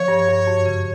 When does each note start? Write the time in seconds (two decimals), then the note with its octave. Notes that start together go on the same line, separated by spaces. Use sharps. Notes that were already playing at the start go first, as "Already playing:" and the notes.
Already playing: F3 C#5
0.08 G2
0.28 G2
0.47 F#2
0.66 C#3